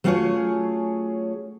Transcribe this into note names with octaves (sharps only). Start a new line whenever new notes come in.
F#3 A3 C#4 F4 G#4 C#5